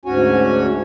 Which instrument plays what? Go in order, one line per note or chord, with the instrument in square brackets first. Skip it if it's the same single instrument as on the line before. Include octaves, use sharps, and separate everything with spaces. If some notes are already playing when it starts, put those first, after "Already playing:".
[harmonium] D2 G#2 C#4 F#4 C#5 G#5